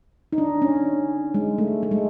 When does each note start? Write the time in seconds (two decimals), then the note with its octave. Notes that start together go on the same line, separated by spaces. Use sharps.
0.33 D#4
0.38 D4
0.62 C#4
1.34 G#3
1.58 A3
1.83 A3
1.91 G#3